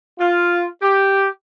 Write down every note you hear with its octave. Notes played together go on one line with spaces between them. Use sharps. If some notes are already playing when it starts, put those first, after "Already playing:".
F4
G4